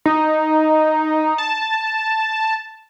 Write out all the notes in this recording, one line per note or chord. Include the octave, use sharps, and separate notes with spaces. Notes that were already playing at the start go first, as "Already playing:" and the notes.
D#4
A5